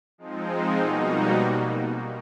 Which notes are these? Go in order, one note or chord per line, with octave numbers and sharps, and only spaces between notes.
F3 G#3 C4 D#4
B2 G3 A#3 D#4 F#4